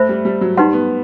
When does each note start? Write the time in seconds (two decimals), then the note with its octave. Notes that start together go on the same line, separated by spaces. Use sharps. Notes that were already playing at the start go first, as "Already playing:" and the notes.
Already playing: A3 C5 E5 B5
0.09 G3
0.25 G3
0.41 F#3
0.57 G3 D#4 G4 B4 F#5 C6
0.73 B3